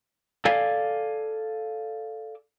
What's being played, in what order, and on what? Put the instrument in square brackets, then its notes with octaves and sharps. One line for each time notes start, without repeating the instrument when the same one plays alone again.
[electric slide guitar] A4 D5 F5 G#5